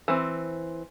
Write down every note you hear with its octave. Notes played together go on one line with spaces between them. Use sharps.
E3 C4